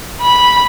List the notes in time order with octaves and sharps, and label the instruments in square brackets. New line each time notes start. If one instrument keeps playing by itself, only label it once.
[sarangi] B5